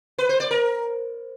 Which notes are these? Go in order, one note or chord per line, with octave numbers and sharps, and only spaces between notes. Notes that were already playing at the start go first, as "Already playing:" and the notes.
B4
C5
D5
A#4